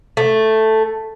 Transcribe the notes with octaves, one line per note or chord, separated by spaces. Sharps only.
A3